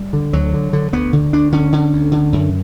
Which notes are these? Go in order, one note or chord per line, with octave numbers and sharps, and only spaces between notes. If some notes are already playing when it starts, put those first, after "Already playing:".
Already playing: G3
D3
D2 F#3
D3
D3
D2 B3
D3
D2 D4
D3 C#4
D3
D2
D3
F#2